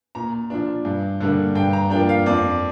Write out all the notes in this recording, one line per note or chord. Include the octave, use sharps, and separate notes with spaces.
A#2 A#5
F3 D4
G2
D3 G3 A#3 D4
G2 G5
A#5
F3 A#3 D4 G5
F5
F2 D5